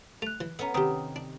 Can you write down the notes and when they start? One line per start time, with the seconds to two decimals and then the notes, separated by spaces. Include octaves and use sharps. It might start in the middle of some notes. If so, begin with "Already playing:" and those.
0.22 A3 F#6 F7
0.41 E3
0.59 B3 C#4 A4 E5 A#5
0.74 C3 D#3 C4 G4 G5 A#5 D#6
1.16 D4